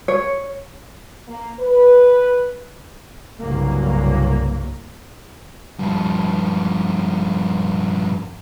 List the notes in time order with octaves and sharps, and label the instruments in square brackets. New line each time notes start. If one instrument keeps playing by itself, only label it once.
[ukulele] C#5
[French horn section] A#3
B4
[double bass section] C2 G2 C#3 F#3 A#3
[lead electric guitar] G2 F3